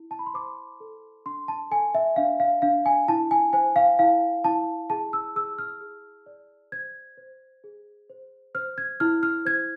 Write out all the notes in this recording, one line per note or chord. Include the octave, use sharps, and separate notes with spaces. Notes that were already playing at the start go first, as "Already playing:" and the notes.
Already playing: E4
A5
B5
C6
C5 D6
A4
D4 C6
A5
A4 G#5
E5
D4 F5
F5
D4 F5
G#5
E4 A5
G#5
C5 G#5
F5
E4 F5
E4 A5
G#4 A5
E6
G#4 E6
F6
G#4
D5
C5 G#6
C5
G#4
C5
C5 F6
G#6
E4 F6
F6
C5 G#6